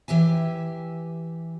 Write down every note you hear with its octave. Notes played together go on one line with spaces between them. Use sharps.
E3 G4 E5 G#5